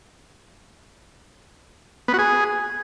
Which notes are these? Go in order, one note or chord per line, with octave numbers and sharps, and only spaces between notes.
B3
F#4
G#4